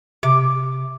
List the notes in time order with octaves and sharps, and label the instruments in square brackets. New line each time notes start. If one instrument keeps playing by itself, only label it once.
[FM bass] C3 [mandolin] D6